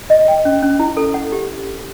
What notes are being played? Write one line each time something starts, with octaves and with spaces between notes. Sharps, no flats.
D#5
G5
C#4
C#4
E4
A4
F#5
G4